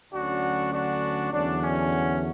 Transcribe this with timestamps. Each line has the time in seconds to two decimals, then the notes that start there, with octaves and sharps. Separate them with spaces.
0.12 D2 D3 F#3 C#4 D4 F#4
0.73 D4 F#4
1.32 E2 D3 F#3 C#4 D4
1.63 C#4